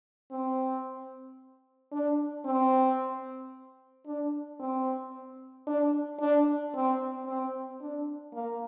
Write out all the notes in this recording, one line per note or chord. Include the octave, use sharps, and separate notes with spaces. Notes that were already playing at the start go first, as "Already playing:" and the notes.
C4
D4
C4
D4
C4
D4
D4
C4
C4
D4
A#3